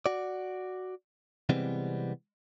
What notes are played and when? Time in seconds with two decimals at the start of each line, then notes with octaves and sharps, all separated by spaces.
0.06 F#4 D5
1.49 C3 E3 G3 G#3 B3 C4